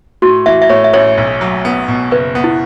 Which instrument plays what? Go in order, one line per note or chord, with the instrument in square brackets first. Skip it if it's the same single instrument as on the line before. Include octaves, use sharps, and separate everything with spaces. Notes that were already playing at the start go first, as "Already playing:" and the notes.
[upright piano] A2 [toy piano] F#4
[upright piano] E3 [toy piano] E5
[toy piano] E5
[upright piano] A2 [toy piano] C#5
[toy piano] E5
[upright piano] A1 [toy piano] C#5
[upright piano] B1
F#3
B3
B2
[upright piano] F#1 [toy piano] B4
[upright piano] B3
[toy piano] E4